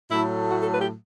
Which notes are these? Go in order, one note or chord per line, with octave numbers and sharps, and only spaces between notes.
A2 F#3 A3 E4
F#4
A4
B4
G4